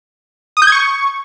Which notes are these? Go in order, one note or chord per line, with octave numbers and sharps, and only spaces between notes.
D#6
G6
G#6
C#6